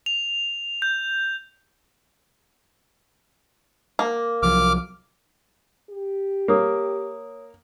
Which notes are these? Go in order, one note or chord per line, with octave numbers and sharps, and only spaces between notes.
F7
G6
A#3
C2 F3 F#3 D6 F6
G4
A#3 C#5 D#6